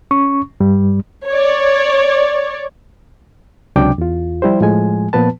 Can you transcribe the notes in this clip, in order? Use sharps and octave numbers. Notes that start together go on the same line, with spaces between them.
C#4 C#6
G2 G3
C#5 D5
C#2 C3 F#3 D4 G5 D6
E2 F4
F3 G3 E4 G4 C5
A2 F3 G#3 G#5
A#2 F3 B3 B4 A5